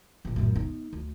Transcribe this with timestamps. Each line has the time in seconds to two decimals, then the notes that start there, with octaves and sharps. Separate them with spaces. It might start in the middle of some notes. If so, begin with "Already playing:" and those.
0.25 A#1 E3
0.36 F#2 A2
0.56 B3 D#4
0.93 D2